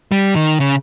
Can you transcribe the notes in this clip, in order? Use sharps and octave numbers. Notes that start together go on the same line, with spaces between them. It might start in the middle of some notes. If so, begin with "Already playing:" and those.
G3
D#3
C#3